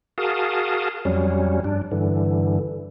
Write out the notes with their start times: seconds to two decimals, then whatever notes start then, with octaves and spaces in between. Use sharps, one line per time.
0.18 F#4 G#4 A#4 F5 A5 D#6
1.05 F2 F#3 G3 C#4
1.64 G2 D4
1.92 G2 D3 E3